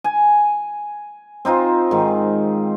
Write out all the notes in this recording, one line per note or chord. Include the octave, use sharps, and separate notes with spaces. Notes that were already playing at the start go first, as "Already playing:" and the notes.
G#5
C4 D#4 F4 C5
G#2 D#3